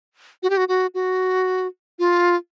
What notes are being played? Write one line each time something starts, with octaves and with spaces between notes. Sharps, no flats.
F#4
G4
F#4
F#4
F#4
F4